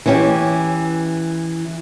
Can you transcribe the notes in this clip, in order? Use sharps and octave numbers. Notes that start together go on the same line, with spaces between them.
E3 C#4 G4